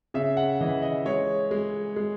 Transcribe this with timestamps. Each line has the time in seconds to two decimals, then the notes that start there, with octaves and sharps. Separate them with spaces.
0.14 C#3 E5
0.37 F#5
0.61 E3 D#5
0.82 D#5
1.05 G#3 C#5
1.51 G#3
1.96 G#3